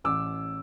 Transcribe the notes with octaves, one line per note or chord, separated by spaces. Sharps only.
A1 D6 E6